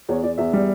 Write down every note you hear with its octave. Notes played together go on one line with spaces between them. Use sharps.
E2 C#5
E2 D5
E2 E5
G3